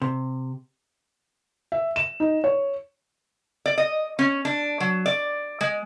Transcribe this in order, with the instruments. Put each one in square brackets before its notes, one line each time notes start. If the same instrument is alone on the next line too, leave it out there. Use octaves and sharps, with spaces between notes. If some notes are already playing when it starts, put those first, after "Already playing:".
[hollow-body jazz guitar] C3
[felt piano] E5
E7
D#4
C#5
[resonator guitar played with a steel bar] D5
D#5
C#4
D4
F#3
D5
G#3